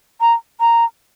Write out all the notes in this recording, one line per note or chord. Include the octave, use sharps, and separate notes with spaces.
A#5
A#5